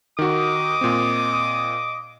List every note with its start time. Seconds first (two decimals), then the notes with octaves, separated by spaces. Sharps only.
0.19 D#3 F#4 D#5 D6 D#6
0.81 A#2 C4